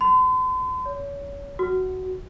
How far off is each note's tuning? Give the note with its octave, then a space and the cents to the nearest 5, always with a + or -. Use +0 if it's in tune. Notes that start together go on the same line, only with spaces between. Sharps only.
C6 -45
C#5 +30
F#4 +10